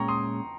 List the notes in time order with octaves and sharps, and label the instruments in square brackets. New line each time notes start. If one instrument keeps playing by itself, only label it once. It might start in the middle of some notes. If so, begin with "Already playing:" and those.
Already playing: [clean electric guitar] A#2 G#3 C#4 [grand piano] G5 A#5 C#6
[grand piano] C6 D#6